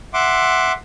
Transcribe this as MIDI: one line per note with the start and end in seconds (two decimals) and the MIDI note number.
0.14 0.72 76
0.14 0.72 78
0.14 0.72 84
0.14 0.72 86